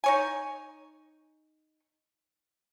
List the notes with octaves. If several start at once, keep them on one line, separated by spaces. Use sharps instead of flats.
D#4 C#5 G#5